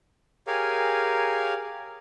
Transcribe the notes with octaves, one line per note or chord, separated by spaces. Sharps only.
G4 G#4 A#4 C#5 F5 G#5